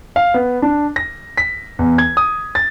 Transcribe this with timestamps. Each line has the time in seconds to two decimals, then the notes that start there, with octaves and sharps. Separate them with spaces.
0.16 F5
0.34 B3
0.62 D4
0.96 A#6
1.37 B6
1.79 E2
1.98 G#6
2.17 D#6
2.55 A6